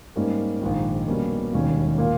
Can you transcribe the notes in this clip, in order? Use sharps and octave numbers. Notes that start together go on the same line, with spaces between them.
G#2 G3 A#3 C#4
A#1 G#2 D#3
B2 G3 A#3 C#4
E1 D#2 D#3 G3 C#4
A#2 A#3